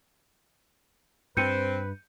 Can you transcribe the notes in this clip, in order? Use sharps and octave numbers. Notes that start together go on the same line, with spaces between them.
G2 C4 B4 G6 C#7 D#7